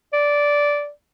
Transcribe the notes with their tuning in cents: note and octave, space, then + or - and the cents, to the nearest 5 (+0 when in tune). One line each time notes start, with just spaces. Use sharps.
D5 -10